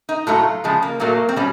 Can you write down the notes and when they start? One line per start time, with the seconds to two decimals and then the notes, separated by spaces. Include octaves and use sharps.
0.09 D#4
0.27 A2 F#3 A3 F4
0.64 C#3 F3 G#3
0.82 A#3
1.00 A#2 F#3 A3 A#3
1.29 C4
1.36 B2 G3 C#4